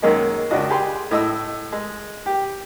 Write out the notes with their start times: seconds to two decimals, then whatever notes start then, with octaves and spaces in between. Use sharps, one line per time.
0.02 F#2 D#3 G#3 A#3 D#4
0.51 C#2 D4 F#4 D#5
0.70 G4 G#4 C6
1.11 A2 D#5 E6
1.72 G#3
2.26 G4